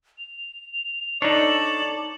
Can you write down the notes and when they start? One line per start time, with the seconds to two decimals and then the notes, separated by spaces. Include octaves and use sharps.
0.19 F7
1.22 D4 D#4 A4 C#5 D5 F#7